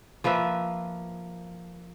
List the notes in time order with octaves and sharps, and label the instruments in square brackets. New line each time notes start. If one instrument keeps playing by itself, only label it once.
[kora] F3 A#3 B4 E5